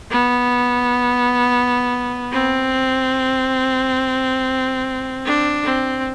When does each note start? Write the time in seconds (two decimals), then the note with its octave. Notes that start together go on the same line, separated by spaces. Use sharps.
0.11 B3
2.32 C4
5.26 D4
5.64 C4